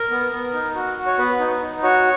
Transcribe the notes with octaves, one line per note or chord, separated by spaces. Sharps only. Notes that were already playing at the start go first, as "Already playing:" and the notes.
Already playing: A#4
B3
B3
D#4
F#4
F#4
C#5
B3 B4
D#4
D#4
F#4 C#5